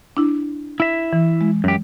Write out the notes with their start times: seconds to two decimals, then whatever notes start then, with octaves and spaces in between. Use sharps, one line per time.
0.17 D4 E4
0.80 E4 E5
1.13 E3
1.41 G#3
1.64 F#2 G4